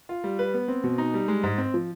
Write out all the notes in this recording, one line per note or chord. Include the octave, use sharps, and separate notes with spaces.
F4
G3
B4
B3
C4
B2
D#4
G3
G#3
G#2
C4
F3